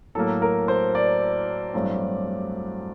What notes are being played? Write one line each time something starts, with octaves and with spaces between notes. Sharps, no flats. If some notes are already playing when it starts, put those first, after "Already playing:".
A2 F#3 A#3 A4
A#4
C5
D5
A1 G2 F#3 A3 C4